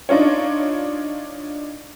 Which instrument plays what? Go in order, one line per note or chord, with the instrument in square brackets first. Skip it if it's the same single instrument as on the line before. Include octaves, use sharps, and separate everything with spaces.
[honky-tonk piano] D4 D#4 F4 C#5